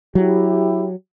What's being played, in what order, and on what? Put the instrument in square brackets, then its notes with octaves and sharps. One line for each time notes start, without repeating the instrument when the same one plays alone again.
[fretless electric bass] F#3 [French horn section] E4 G4